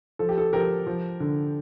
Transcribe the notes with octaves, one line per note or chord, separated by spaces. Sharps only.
F3 A4
G4
A4
F3 G4 A#4
F3
D3